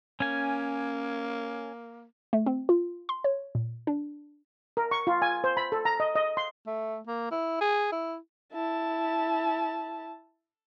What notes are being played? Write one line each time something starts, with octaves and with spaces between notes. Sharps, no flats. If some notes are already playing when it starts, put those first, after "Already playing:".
A#3 C#4 G#5
A3
C4
F4
C6
C#5
A#2
D4
A#4
C#6
F4
G#5
C5
B5
A4
A#5
D#5
D#5
C6
A3
A#3
E4
G#4
E4
E4 A5